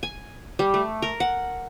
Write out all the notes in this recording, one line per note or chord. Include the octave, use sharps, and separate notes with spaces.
G#5
G3
A3
A#4
F#5